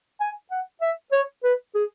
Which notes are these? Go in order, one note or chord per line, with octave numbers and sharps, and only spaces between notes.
G#5
F#5
E5
C#5
B4
G#4